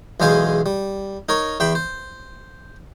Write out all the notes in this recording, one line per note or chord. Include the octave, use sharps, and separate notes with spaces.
B1 E2 G#3 C5 F5 G#5
G3
D#4 A#4 C#5
E2 E5 G5 B5 C6
C5